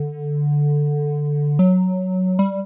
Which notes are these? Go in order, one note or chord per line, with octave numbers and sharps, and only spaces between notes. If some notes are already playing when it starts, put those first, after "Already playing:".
Already playing: D3
F#3
G3